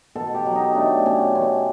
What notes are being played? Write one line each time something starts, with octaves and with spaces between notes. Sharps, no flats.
B2 A4
G4
F#3
D#4
A3 D4
B2 C#4
B3 C#4